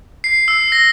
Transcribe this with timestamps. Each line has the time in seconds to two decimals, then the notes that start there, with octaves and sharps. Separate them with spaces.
0.24 C7
0.48 E6
0.72 A#6